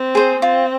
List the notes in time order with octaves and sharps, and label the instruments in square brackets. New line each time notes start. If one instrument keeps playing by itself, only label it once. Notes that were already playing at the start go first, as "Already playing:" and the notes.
Already playing: [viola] C4
[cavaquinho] G#4 C5
[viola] C4 [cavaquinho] F4